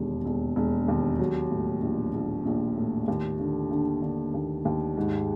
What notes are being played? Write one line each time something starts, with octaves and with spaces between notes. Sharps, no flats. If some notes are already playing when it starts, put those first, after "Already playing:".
Already playing: E1 D#2 D3
E1
E1
D#2
F#3
A2
A#1
A#1
A#1
A2
D#2
D3
D3
D3
D#2
D#2
G#2